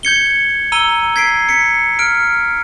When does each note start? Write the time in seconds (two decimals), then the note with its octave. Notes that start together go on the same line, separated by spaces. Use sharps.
0.03 G6 G#6 C#7 G7
0.72 A#5 E6 D#7 G7
1.16 G#6 B6 C7 D7
1.49 B6 C#7
1.99 F6 D7